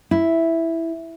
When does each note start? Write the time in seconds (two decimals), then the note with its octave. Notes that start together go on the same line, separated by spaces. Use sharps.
0.11 E4